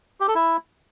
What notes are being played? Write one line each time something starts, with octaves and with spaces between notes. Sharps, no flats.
G4
A4
E4